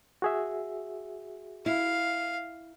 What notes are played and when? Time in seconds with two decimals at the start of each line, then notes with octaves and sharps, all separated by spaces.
0.22 F#4 G#4 E5
1.66 E4 F5